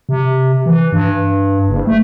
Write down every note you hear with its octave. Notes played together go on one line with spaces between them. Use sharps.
C3
E3
G2
F#1
A3